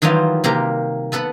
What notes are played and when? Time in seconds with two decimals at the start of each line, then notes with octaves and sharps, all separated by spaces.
0.02 D#3 E3 F#3 G3 F4 D#5
0.44 C3 A#3 G4 A#4
1.12 B3 A4 B4 F#5